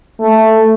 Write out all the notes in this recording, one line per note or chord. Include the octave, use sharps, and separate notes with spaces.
A3